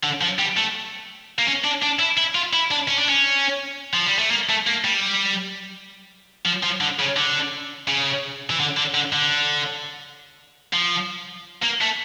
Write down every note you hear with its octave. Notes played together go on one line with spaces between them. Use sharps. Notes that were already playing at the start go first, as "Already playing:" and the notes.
D3
F3
G3
A3
A#3
C#4
D4
D4
E4
E4
F4
E4
D4
C#4
D4
C#4
F3
G3
A3
A#3
A3
A#3
G3
F3
F3
D3
C#3
D3
C#3
E3
D3
D3
D3
D3
F3
A#3
A3